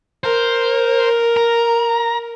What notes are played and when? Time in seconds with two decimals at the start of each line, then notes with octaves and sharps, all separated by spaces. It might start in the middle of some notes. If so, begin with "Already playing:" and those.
0.24 A#4 C5
1.37 A#5